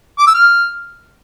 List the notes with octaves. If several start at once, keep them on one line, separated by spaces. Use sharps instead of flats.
D6
E6
F6